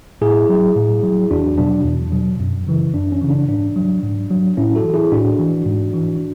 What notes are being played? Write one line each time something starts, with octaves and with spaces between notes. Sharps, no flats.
A2 E4 G#4
F#3
A2
F#3
E2 D4 F#4
B2 F#3 D4
E2
B2 F#3
F#2
C#3 E3
F#2 D4
C#4
C#3 E3
D4
G#2 D4
F#3
G#2
F#3
A2 C#4 E4
F#4 A4
E3
E4 G#4
A2 D4 F#4
E3
G#2
E3